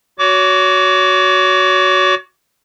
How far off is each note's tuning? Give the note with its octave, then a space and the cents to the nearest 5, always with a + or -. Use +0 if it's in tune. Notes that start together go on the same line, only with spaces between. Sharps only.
F#4 +0 C#5 +30 D6 -20